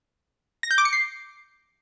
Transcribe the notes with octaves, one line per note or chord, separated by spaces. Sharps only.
A#6
G6
D6
C#7
C7